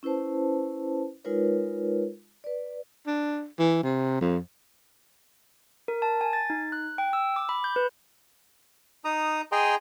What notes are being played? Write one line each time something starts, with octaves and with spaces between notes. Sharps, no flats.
C#4 E4 B4 C5 A5
G#3 D#4 F4 A#4 B4 C#5
B4 D5
D4
E3
C3
F2
A#4
A5
G#5
A6
D#4
F#6
G5
E6
D6
B5
G6
B4
D#4 A#5 D#6
G#4 D#5 G5 G#5 A#5 C6